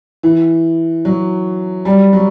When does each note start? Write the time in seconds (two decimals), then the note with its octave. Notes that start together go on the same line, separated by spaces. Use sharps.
0.23 E3
1.05 F#3
1.85 G3
2.13 F#3